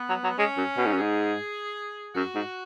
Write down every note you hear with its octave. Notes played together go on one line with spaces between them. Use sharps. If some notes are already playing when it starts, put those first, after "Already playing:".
Already playing: B3
F#3
F#3
G#3 C#4
F#2
B2
G#2
F#2
G#2 G#4
F#2 F#4
G#2